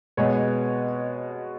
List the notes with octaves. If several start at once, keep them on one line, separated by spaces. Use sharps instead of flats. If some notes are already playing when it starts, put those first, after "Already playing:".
B2 G#3 B3 C#5